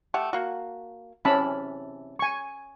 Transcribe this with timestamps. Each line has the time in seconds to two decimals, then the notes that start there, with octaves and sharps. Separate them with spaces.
0.14 A3 G4 F#5
0.33 A#3 F#4
1.25 C3 E3 C#4 A5 B5
2.19 G#5 C#6